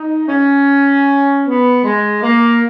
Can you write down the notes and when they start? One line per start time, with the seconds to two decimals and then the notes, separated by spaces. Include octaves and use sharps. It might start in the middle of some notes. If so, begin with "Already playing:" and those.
Already playing: D#4
0.28 C#4
1.45 B3
1.84 G#3
2.22 A#3